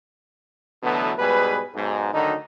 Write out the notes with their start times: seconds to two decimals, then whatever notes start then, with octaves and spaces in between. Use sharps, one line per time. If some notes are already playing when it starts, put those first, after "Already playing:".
0.83 B2 D3 E3 F#3 A3 B3
1.19 G#2 B2 G3 G#4 B4
1.74 B1 G#2
2.14 D2 D3 D#3 F#3 D#4